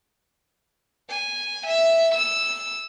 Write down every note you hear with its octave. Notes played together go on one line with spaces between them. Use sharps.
G#5
E5
E6